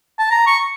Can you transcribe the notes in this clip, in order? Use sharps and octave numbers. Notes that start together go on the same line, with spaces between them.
A5
A#5
C#6